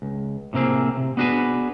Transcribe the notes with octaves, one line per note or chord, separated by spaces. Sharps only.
C#2
A2 C3 A#3 C4 G#4
C3
B3 D4 F#4 G#4 B4